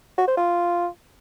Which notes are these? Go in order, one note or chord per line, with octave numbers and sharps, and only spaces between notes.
F#4
C5
F4